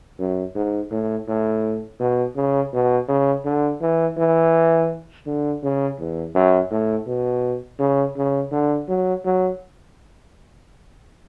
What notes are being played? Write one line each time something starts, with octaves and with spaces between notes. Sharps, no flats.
F#2
G#2
A2
A2
B2
C#3
B2
C#3
D3
E3
E3
D3
C#3
E2
F#2
A2
B2
C#3
C#3
D3
F#3
F#3